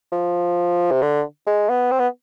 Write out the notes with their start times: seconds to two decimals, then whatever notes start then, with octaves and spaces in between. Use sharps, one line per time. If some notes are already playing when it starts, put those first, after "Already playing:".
0.12 F3
0.91 C3
1.02 D3
1.47 G#3
1.69 B3
1.91 C4
1.99 B3